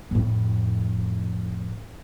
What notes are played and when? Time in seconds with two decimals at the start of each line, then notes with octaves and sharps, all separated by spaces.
0.11 F2 A2